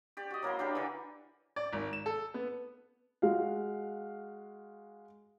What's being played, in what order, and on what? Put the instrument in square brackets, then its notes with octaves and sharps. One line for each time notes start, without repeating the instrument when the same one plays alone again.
[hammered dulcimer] G4 D5
F#4 D#5
F#3 A#3 E4 C6
D4 G4 A#4 B4
D3 E3
[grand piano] D5
G#1
E7
A4
B3
[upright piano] G#3 F#4 F5